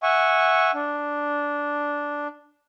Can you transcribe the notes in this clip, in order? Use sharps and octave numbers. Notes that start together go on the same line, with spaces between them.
E5 F#5 G#5 C#6
D4